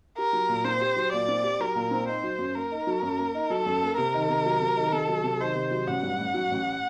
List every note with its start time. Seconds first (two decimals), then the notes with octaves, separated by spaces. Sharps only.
0.18 G4 A#4
0.33 F#3
0.49 A#2
0.65 C4 C5
0.81 G4
0.96 F#3
1.12 A#2 D5
1.28 C4
1.44 G4
1.60 F#3 A#4
1.75 A#2
1.91 C4
2.08 D#4 C5
2.23 F#3
2.39 F#2
2.55 A#3 A#4
2.71 D#4
2.87 F#3
3.03 F#2
3.18 A#3
3.34 D#4
3.50 F#3 A4
3.66 F#2
3.82 A#3
3.97 C3 A#4
4.14 D#3
4.29 C3
4.45 F#3
4.61 C3
4.76 D#3
4.92 C3 A4
5.08 F#3
5.24 C3
5.40 D#3 C5
5.55 C3
5.71 F#3
5.87 A1 F#5
6.02 G2
6.18 A1
6.34 F#3
6.51 A1